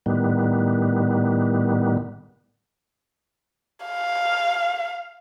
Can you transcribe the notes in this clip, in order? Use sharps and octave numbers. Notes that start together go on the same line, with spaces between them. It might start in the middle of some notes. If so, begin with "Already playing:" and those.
A2 D#3 G3 B3
F5